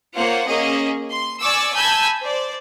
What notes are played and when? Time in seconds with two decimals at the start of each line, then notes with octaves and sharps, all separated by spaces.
0.15 A#3 F4 C5 C#5 F#5
0.47 A#3 C#4 G#4 D#5
1.10 C6
1.41 D5 G#5 C#6 D6 E6
1.74 G#5 A5 B5 E6 G6 G#6
2.21 C5 D5